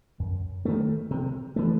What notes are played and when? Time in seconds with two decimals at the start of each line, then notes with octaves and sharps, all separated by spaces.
0.20 F#2
0.65 D#3 A3
1.11 C3
1.56 E3 A3